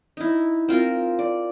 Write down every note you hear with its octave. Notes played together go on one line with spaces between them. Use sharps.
D#4 E4
C4 F4 A#4
D5